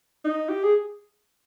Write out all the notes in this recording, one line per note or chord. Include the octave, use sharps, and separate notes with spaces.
D#4
G4
G#4